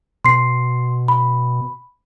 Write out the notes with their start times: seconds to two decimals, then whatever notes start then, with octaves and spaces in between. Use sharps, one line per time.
0.25 B2 C6 C7
1.08 B5